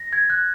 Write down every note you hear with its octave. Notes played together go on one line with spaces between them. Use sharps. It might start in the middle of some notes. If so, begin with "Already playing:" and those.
Already playing: A#6
G#6
F#6